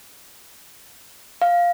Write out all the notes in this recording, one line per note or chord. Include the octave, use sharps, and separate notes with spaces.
F5